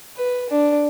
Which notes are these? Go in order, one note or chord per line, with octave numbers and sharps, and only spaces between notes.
B4
D4